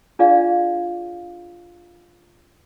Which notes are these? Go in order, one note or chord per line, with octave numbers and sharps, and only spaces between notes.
D4 F4 G#4 D5 F5